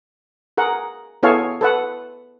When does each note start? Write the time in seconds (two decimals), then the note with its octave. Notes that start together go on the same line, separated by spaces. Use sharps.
0.57 G#4 A#4 F#5
1.23 B3 E4 G#4 A4 C#5 F5
1.61 A4 B4 F#5